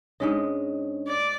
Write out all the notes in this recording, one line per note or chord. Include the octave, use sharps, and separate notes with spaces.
G#2 G#3 C#4 D4 C#5 D#5
D5